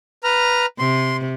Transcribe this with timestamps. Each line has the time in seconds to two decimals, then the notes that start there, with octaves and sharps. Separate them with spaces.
0.24 B4 A#5 F6
0.79 C3 C6